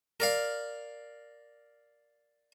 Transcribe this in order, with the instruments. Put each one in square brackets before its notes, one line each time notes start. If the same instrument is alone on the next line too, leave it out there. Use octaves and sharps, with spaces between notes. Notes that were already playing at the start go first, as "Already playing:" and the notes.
[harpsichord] A#4 D5 F5